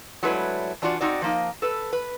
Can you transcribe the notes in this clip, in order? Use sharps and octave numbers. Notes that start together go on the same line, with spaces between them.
F#3 G#3 A3 D4 E4 B4
E3 D4 F4 F#4 D5
C4 D#4 F#4 D5
F3 A#3 D#4
A4 B4
B4